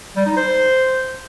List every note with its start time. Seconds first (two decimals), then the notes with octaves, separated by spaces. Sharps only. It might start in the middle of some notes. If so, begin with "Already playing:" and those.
0.16 G3
0.26 D#4
0.37 C5